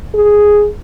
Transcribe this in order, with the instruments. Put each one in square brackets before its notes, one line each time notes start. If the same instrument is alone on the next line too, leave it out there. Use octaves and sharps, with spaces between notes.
[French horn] G#4